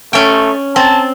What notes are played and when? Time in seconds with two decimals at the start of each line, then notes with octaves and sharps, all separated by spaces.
0.13 A3 C#4 G5
0.76 C4 A5